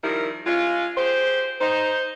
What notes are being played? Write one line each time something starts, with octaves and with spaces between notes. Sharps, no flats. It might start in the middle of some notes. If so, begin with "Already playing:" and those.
D#3 F3 G3 E4 A#4
G#3 C#4 F4
G4 G#4 C5
D#4 C5